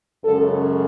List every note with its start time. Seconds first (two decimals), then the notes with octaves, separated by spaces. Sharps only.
0.25 F#2 C#3 G#3 A4